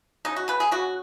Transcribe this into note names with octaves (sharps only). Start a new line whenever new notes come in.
C#3 D#4
F#4
C#3 B4
G#4
C#3 F#4